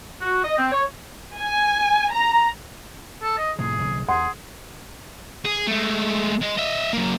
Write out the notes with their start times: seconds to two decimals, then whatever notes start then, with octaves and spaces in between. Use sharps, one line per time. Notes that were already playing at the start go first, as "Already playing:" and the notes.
0.22 F#4
0.44 D#5
0.59 C4
0.72 C#5
1.38 G#5
2.12 A#5
3.22 A4
3.38 D#5
3.59 A2 C3 F3 G#4
3.79 F#1 B1 D#3
4.08 E2 G#4 F#5 C6
5.45 G#4
5.68 G#3 A3
6.41 G#3 D#5
6.57 D#5 E5
6.93 F#3 A#3